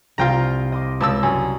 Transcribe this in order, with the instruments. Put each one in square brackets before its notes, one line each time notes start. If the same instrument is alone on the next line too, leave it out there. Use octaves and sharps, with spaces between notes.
[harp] C2 C4 C6 [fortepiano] F4 G5 A#5
[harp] D#5 C6 D6
[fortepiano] C#2 A5 E6
[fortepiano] F#2 [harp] G#5 D#6